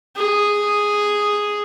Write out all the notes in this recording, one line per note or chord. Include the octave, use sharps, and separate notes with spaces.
G#4